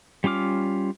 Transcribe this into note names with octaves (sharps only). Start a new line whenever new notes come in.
G3 C#4 F4 D6 F6